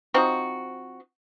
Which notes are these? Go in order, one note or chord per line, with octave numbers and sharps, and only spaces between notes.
F3 C4 D#4 F#4